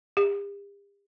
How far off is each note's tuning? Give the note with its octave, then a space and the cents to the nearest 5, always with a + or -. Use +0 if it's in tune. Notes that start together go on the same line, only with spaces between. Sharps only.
G4 +40